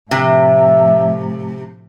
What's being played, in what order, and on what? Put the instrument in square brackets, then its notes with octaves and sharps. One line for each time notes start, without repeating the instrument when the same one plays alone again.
[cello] A2 F3 [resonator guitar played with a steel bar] C3 [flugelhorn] E5